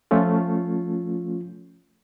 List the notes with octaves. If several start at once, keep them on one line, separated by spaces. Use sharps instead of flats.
F3 A3 C#4 F4